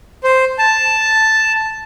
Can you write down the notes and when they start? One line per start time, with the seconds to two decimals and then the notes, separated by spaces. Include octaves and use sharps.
0.24 C5
0.58 A5